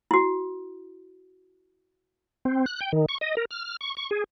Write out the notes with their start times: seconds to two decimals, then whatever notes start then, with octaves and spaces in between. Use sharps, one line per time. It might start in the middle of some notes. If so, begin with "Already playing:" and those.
0.11 E4 F#4
2.45 C4
2.66 F#6
2.81 G5
2.93 D#3
3.09 C#6
3.21 D#5
3.37 A#4
3.51 F6
3.81 C#6
3.97 C#6
4.11 G#4